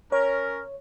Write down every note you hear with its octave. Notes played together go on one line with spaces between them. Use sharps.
C#4 A#4 C#5